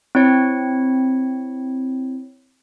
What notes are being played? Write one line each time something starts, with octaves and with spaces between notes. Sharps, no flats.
C4 E4 C#5 C#7